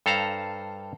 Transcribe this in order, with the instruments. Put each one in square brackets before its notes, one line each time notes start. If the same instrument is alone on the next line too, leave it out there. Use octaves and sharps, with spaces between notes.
[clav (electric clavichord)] G2 A4 C5 F5 A#5